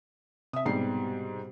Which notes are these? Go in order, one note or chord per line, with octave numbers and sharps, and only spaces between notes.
C3 E5 D#6
G#2 B2 G3 C7